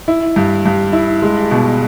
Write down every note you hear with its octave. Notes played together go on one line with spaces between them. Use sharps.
E4
G2
G2
E4
G#3
B2